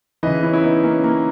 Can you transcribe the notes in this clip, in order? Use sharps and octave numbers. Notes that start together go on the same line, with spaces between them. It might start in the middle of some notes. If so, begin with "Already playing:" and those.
C#3 E3 B4 D#5
C#4 E4
E4
B3 D#4
A#3 C#4
A#3 C#4